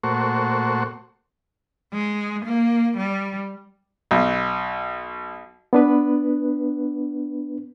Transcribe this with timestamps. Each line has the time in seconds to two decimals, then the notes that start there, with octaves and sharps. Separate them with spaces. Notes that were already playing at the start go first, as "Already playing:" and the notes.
0.04 A#2 A3 F#4 C5 C#6
1.93 G#3
2.45 A#3
2.97 G3
4.11 B1
5.73 B3 D4 B4